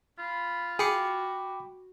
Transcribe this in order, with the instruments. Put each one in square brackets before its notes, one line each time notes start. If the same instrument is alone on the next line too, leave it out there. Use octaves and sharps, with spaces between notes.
[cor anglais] F4 [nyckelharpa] B5
[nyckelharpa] F#4 [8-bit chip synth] G#4 C#7 [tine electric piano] G5 B5 D6